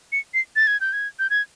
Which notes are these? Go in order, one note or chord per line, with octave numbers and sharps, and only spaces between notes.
C#7
C7
A6
G#6
G6
G#6
G6
G#6